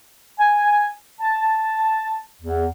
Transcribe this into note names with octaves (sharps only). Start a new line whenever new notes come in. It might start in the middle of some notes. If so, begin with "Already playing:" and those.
G#5
A5
E2